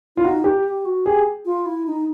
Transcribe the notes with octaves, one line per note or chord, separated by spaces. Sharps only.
E4 F4
D#4 F#4
G4
G4
F#4
G4 G#4
F4
E4
D#4